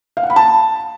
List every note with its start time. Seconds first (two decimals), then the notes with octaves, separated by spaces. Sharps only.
0.17 F5
0.23 F#5
0.30 B5
0.36 A5